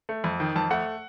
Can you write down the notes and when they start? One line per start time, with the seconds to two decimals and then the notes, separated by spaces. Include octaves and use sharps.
0.09 A3
0.24 F2
0.40 D#3
0.56 F2 A5
0.71 A3 F#5